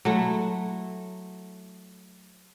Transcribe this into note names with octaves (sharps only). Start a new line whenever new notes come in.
F#3 A3 E4